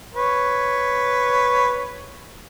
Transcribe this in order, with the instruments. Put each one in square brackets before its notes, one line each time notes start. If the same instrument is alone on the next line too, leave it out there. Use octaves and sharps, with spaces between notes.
[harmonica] B4 C#5